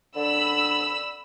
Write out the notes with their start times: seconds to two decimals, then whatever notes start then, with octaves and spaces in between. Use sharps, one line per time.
0.16 D3 B5 E6